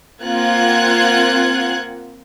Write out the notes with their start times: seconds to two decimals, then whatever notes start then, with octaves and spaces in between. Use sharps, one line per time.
0.23 A#3 C4 F4 F#5 F#6 G#6